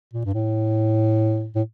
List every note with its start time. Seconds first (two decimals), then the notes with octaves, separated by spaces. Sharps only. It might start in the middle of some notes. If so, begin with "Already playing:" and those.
0.14 A#2
0.25 G2
0.34 A2
1.55 A2